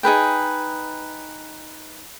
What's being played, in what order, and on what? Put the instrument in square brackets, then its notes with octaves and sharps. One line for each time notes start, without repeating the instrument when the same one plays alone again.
[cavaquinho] D#4 G#4 B4 G5